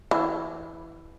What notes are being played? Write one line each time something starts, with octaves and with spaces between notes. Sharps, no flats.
E3